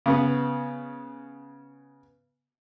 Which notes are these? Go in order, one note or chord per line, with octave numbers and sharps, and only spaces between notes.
C#3 B3